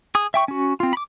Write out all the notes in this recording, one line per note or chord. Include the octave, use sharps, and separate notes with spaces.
G#4 D#6
E5 G5 C#6
C#4 F#4
C4 F4
B5 D6